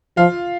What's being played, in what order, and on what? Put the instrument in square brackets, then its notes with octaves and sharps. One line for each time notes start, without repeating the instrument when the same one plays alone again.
[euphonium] F3 [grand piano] F4 F5